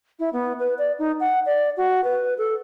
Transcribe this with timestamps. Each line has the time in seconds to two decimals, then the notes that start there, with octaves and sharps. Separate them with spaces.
0.19 E4
0.33 B3
0.60 B4
0.78 D5
0.99 D#4
1.20 F#5
1.46 D5
1.77 F#4
2.04 B4
2.38 A4